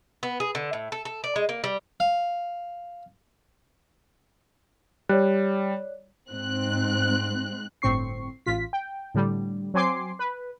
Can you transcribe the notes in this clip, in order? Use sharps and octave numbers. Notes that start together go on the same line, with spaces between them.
B3
G#4
D3
A2
A4
A4
D5
G#3
A#3
G3
F5
G3 C#5 D5 F#6
G#2 C4 F#6
G1 A2 C4 C#6 C7
A1 F4 B6
G5
A2 D3 G3
F#3 C4 G#5 C6 D6 C7
B4